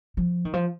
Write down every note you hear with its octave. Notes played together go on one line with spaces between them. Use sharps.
F3
D#3
F3